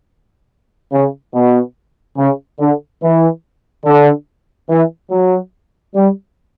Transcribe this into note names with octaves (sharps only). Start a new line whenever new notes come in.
C#3
B2
C#3
D3
E3
D3
E3
F#3
G3